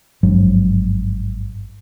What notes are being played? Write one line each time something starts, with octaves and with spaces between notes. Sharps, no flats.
G#1 G2 F3 F#3